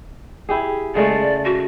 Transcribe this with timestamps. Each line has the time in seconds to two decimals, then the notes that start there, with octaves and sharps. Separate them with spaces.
0.49 E4 G4 G#4
0.95 C#3 G#3 A3 D5
1.45 F#4